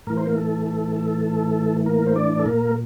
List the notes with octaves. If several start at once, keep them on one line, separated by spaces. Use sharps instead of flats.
A2 E3 A#4
C5
A#3 A#4
A4
A4
A4
A#3 A#4
C5
D4 D5
A4
A#2 A#3 A#4